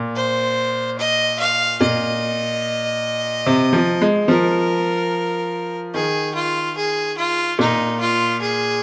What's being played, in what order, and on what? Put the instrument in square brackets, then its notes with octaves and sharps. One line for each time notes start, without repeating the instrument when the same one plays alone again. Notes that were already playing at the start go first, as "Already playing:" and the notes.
Already playing: [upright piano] A#2
[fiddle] C5
D#5
F5
[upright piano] A#2 [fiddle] D#5
[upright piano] C3
F3
G#3
[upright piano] F3 [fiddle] A#4
[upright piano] D#3 [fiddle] G#4
[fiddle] F4
G#4
F4
[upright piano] A#2 [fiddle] D#4
[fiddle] F4
G#4